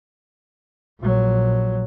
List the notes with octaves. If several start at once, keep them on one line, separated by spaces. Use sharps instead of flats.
A#1 F#3